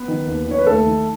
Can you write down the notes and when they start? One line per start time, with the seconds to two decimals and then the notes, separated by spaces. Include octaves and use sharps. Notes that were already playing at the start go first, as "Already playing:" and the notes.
Already playing: B3 B4
0.08 D#3
0.27 D#2
0.46 D#3 C#5
0.58 B4
0.66 D#2 A3 A4
0.86 D#3